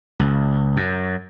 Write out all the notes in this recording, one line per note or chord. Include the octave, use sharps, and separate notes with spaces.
C#2
F#2